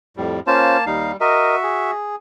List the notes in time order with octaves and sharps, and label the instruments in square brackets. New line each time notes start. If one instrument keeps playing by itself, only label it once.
[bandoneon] F2 A2 G3
[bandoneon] A#3 A5 [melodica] C#4 F4 C5
[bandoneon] D#2 D#4 F5 [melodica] G3
[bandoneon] F#4 E5 [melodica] A#4 D#5
[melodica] G#4